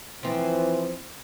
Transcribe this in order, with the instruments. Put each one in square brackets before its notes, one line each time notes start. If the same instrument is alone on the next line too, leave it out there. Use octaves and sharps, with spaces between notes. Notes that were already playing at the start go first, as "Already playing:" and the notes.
[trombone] E3 [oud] F3 C4